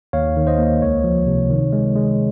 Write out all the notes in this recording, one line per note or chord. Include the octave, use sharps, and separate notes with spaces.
D#2 C#5 F5
D#3
C5 D#5
A#3
C#2 C#5
F3
C3
D#3
G#3
G#3